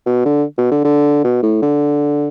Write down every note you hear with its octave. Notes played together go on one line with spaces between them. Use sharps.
B2
D3
B2
D3
D3
B2
A2
D3